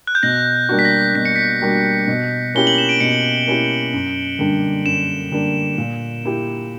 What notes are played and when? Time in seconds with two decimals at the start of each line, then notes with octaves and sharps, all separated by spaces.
0.07 F#6
0.15 G6
0.23 B2 A#6
0.69 G3 A#3 D4 F#4
0.79 B6
0.85 A#6
1.15 B2 B6
1.25 C#7
1.36 B6
1.62 G3 A#3 D4 F#4
2.07 B2
2.54 A#3 C#4 E4 G4 G7
2.67 F#7
2.78 E7
2.89 D7
3.00 B2 C#7
3.47 A#3 C#4 E4 G4
3.93 F#2
4.39 D3 G3 A#3 D4
4.86 F#2 E7
5.32 D3 G3 A#3 D4
5.78 A#2
6.24 A#3 E4 G4